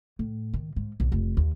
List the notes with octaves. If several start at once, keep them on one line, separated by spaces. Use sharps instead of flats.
A2
D#3
G#2
B1
F1
D#2